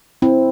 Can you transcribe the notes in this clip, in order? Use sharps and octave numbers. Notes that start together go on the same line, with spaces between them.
C4 E4